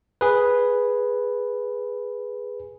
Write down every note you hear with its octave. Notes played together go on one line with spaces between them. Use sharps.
G#4 B4